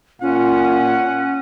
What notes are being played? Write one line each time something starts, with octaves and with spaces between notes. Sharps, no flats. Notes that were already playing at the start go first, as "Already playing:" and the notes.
A#2 C#4 F4 F#5